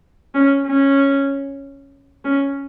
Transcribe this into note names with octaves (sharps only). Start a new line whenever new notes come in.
C#4
C#4
C#4